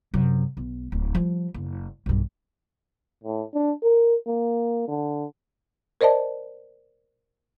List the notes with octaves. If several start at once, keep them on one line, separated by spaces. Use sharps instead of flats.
F#2 C3
B1
D1
F3 G3
F#1
B1 G2
A2
D4
A#4
A#3
D3
A#4 C5 D5 D#5 A5